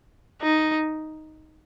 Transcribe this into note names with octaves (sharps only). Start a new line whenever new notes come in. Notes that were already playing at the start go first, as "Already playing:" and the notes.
D#4